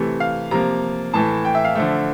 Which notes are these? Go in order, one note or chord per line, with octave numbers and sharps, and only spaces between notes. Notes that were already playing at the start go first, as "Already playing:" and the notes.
Already playing: C3 E3 A3
F5
C3 F3 A#3 A#5
A2 E3 A3 A5
G5
E5
F5
D3 F3 A3 E5